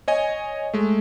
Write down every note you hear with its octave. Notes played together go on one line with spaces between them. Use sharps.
C#5 D#5 G#5
G#3 A3